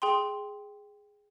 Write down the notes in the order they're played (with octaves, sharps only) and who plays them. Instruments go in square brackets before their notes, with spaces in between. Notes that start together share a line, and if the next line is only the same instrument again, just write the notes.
[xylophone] G#4 G5 C6